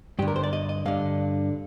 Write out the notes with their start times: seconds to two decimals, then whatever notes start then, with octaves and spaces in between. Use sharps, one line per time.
0.19 G2 G4
0.22 D3
0.28 A#4
0.36 C5
0.43 D5
0.53 D#5
0.69 D#5
0.86 G2 D3 F5